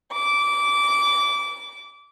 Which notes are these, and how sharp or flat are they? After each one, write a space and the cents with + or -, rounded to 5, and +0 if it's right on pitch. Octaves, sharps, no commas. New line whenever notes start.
D6 -20